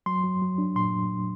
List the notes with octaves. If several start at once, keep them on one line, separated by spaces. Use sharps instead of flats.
F#3 C6
F#3
F#3
D4
A#2 C6